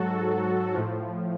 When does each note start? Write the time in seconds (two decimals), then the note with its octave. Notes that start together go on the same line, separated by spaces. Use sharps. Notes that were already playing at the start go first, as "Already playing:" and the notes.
Already playing: G#2 F#3 F#4 A4
0.74 A2 F3